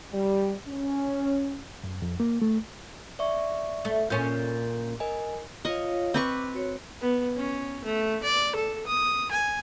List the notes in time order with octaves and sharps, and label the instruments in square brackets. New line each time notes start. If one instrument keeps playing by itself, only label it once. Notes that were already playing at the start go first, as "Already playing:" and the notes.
[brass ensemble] G3
C#4
[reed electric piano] F#2
F2
A#3
A3
[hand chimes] D5 E5 C#6
[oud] A3
[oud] A#2 C#4 [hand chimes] G6
[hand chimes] A#4 D#5 G#5
[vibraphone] F4 C#5 F5 [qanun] D#5
[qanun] C4 B4 C#6 [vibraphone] D6
[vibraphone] F#4 C#5
[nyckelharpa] B3
C#4
A3
D5
A4
D#6
G#5